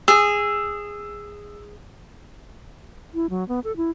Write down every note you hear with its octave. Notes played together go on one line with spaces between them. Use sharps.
G#4 E6
E4
F#3
B3
A4
E4